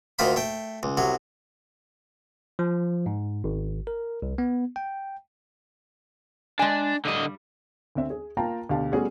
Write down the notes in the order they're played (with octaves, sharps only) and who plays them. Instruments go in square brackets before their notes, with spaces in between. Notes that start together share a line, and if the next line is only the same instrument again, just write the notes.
[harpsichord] D2 D#3 F4 C5 B5
A3 G5
C#2
C2 F#3
[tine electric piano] F3
G#2
G#1
A#4
C2
B3
G5
[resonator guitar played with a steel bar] G#3 G#5 [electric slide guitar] D4
[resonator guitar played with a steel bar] G2 G3 [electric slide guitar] D3 D#5
[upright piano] D2 C4 E5
G#4
A#3 F4 F5 G5 A5 A#5
D2 B2 G4 F5 A5
G3 A3 B3 C#4 F#4 G#4